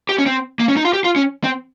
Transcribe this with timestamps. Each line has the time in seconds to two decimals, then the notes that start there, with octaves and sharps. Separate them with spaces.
0.09 G4
0.18 C#4
0.26 C4
0.59 A#3
0.68 C#4
0.77 D#4
0.85 F4
0.93 G4
1.04 F4
1.16 C#4
1.44 C4